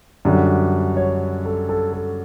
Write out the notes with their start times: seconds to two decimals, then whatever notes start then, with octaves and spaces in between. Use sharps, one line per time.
0.25 F#2 D3 G3 D4
0.97 C#5
1.45 A4
1.69 A4
1.93 A4